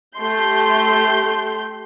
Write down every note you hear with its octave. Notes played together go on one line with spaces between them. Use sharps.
A3 G4 C6 G6